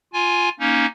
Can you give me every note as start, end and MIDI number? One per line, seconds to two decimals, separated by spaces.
0.13 0.49 65
0.13 0.49 80
0.60 0.86 58
0.60 0.86 61
0.60 0.86 63